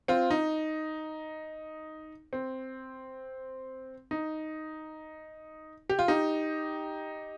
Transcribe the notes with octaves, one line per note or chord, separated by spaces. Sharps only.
C4 F4
D#4
C4
D#4
G4
F4
D#4 G4